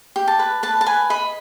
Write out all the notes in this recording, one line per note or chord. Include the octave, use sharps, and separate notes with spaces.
G4
A5
B4
B4 A5
A5
B4 G#5
D#5 B5